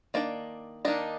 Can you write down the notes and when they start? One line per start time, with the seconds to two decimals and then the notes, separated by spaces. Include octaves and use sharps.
0.14 D#3 A#3 D4 D5
0.85 D#3 A#3 D4 D#4